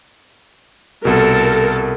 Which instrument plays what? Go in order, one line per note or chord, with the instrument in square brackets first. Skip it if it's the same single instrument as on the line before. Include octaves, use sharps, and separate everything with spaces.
[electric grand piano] C2 B2 [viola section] A4 A#4